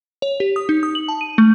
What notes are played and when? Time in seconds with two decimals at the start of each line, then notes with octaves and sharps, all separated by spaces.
0.22 C#5
0.40 G4
0.56 D#6
0.69 D#4
0.83 D#6
0.95 F#7
1.08 A5
1.21 D#7
1.38 A3